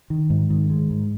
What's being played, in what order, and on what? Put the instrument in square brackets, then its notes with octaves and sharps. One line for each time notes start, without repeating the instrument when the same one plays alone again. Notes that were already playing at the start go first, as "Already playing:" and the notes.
[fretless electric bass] D#3
G#2
D#3
G#3
G#2